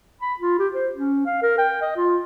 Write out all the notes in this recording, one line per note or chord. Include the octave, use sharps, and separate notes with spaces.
B5
F4
G4
C5
C#4
F5
A#4
G5
D#5
F4